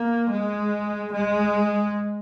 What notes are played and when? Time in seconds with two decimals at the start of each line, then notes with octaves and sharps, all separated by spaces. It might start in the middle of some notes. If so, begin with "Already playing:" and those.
Already playing: A#3
0.32 G#3
1.14 G#3